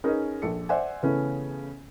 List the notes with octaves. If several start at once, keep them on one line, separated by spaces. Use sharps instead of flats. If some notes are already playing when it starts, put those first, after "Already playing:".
C#4 D#4 G#4 A#4 B4
A#1 A4 C#7
C5 D5 E5 F#5 G#5
C#3 E3 A3 B3 C#4